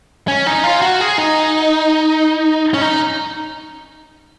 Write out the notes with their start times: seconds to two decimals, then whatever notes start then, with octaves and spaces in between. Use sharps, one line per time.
0.28 C#4
0.46 D#4
0.64 F4
0.82 F#4
1.01 G#4
1.18 D#4
2.74 C#4
2.81 D#4